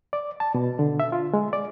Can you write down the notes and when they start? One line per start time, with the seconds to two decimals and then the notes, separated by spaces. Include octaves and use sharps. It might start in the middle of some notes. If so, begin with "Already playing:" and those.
0.13 D5
0.40 A5
0.55 B2
0.79 D3
1.00 E5
1.12 F4
1.34 G#3
1.53 D5